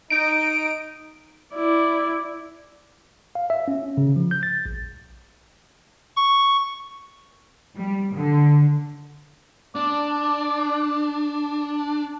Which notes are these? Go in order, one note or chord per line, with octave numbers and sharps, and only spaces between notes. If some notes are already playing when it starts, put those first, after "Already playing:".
D#4 D7
E4 D5
F5
E5
C#4
C#4
C#3
F3
G6
A6
A#1
C#6
G3
D3
D4 D5